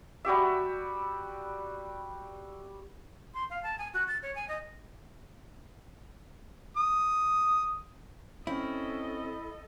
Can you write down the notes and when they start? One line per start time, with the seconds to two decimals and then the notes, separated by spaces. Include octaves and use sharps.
0.25 G3 F#4 G4 E5
3.34 C6
3.50 F5
3.63 A5
3.78 G#5
3.94 F#4
4.08 A6
4.23 C#5
4.35 G#5
4.48 D#5
6.77 D#6
8.47 C4 C#4 E4 A4 D#5